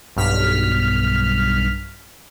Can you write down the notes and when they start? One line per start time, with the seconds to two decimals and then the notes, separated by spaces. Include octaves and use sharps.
0.16 B1 G2 F6 B6